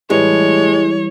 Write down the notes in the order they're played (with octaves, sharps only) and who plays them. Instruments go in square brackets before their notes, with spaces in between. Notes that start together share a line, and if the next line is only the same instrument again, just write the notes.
[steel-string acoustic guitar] A2 [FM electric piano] E3 G3 [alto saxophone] G#3 [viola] C#5